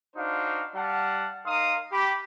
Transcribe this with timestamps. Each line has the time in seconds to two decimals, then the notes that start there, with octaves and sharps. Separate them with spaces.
0.16 D4 D#4 F#4 C5 F5
0.75 G3 F5 F#5 A5
1.46 D#4 A#4 F5 C6 D#6
1.92 G4 B5